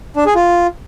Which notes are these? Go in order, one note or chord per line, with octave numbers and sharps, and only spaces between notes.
D4
G#4
F4